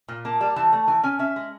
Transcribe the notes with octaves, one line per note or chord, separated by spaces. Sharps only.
A#2
A#3 A5
G3 A5
E3 A5
A3
E3 G#5
C#4 G#5
C#4 E5
G#3